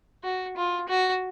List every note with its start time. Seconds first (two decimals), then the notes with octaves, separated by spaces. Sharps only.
0.24 F#4
0.56 F4
0.88 F#4